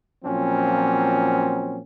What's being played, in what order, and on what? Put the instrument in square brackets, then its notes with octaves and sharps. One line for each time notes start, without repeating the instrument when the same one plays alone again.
[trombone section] A#2 F3 F#3 C4 C#4